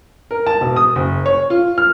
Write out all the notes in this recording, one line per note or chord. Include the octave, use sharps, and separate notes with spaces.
A#4
A5
E1
D#6
F#1
C#5
F4
F6